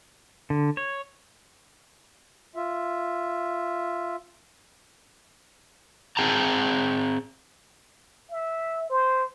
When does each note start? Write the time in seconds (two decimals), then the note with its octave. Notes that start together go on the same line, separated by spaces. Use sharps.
0.50 D3
0.77 C#5
2.56 F4 E5
6.17 C4 G#4 G5 A5 A#5
8.31 E5
8.90 C5